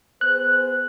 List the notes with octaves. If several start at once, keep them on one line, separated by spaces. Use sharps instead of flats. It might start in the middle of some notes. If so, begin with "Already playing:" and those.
B3 G#4 C5 F#6